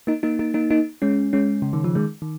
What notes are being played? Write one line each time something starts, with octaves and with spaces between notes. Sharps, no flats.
A#3 D#4
A#3 D#4
A#3 D#4
A#3 D#4
A#3 D#4
G#3 C#4
G#3 C#4
C#3
D#3
F3
D#3 G#3
D#3